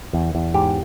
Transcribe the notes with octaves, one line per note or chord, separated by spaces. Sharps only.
E2
E2
G#2 G4